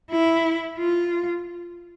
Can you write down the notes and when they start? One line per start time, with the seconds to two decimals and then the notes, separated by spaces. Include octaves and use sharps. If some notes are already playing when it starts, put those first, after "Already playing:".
0.11 E4
0.78 F4